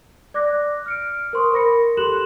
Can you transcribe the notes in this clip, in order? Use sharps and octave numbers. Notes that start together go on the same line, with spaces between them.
D5 D6 F#6 A#6
F6 C#7 D7
A#4 C5 C6 C#6 D#6
A#4 B5 A#6 C#7
G4 A4 C6 F#6 E7 F#7